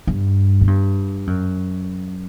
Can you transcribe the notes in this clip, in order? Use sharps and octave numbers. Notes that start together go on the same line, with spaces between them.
G2
A2
G2
F#2